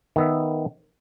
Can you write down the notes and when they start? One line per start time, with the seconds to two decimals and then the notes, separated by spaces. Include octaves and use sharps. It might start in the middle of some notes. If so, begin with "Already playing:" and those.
0.16 D#3 B3 E5